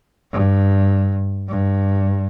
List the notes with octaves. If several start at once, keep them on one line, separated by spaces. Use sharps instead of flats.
G2
G2